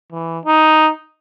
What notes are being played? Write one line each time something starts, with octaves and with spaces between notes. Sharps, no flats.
E3
D#4